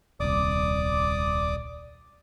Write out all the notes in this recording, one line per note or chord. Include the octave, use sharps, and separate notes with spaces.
D#1 C2 D5 D6 D#6